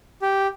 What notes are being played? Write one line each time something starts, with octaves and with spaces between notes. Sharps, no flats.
G4